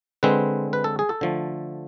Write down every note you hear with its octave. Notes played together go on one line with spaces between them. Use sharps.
D3 G#3 C4 B4
B4
A4
G#4
A4
D3 F3 A3